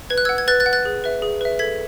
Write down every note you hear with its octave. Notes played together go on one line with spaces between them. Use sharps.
B4 G#6
F#6
F#5 E6 G#6
G#6
B4 F#6 A6
F#6 A6
F#5
F#6 A6
G#4
B4 E5
G#4
B4 E5
A4 G#6 B6